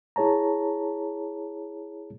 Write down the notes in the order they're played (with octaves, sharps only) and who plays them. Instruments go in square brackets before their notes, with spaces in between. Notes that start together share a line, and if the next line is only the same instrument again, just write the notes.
[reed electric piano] E4 G#4 C#5 A5 A#5